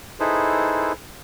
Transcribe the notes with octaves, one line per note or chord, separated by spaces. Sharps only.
D#4 E4 G#4 A4 B4 C5